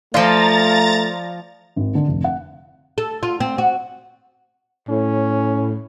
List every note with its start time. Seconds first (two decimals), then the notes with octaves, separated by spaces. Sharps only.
0.14 F3 A3 F4 D5 F5 A#5 F6 A6
1.76 G#1
1.95 D3
2.08 F1
2.24 F#5
2.98 A4
3.23 F4
3.40 C4
3.58 F#4
4.89 A2 C#4